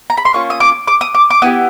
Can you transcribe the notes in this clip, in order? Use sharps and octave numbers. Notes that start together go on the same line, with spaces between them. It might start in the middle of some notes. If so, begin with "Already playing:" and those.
A#5
B5
C6
A#3 C#4 F4 C#6
D#6
D6
D6
D#6
D6
D6
B3 E4 G4 D#6